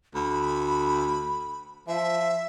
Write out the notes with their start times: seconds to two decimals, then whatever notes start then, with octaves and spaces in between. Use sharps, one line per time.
0.15 D2 B5
1.88 F3 E5